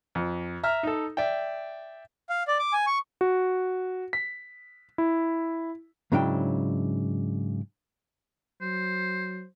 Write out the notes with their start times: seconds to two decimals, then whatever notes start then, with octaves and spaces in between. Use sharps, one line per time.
0.15 F2
0.63 E5 A#5 F6
0.83 D#4 A4
1.17 D5 E5 G5
2.29 F5
2.48 D5
2.59 D6
2.73 G#5
2.87 C#6
3.21 F#4
4.13 B6
4.98 E4
6.12 G#2 C#3 F#3 D4 E4 G5
8.61 F#3 C5